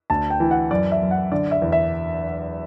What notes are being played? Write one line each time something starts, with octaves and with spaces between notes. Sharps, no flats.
D2 A5
G5
E3
F#5
F#2 D5
E5
F#2
F#5
D3 D5
E5
E2
E5